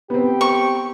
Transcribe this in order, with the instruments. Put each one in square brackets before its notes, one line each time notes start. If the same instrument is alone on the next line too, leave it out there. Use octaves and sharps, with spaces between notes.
[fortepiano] B3 C4 [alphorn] G4
[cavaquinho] C#6